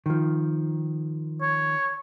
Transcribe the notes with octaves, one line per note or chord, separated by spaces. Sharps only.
D#3 F3
C#5